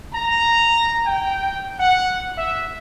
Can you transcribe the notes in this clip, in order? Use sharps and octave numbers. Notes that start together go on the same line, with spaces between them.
A#5
G5
F#5
E5